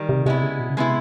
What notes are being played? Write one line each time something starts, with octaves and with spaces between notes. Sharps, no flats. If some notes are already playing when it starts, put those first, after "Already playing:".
Already playing: D#3 G3
C3
C3 G#3 B3 E4
C#3
B2
C#3
C3 G#3 B3 E4